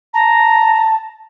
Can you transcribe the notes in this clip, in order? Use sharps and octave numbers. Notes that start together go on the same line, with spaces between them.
A5 A#5